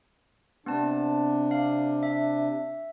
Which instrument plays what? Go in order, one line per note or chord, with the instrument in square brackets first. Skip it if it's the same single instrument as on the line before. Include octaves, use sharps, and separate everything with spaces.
[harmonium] C3 D4 [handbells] B3 C4 A5
[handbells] F5
E5